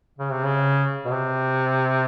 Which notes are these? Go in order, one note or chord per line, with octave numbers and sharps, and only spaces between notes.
C#3
C3
C#3
B2
C3